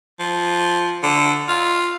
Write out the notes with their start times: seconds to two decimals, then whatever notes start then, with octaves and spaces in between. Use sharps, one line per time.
0.19 F3
1.03 D3
1.48 F4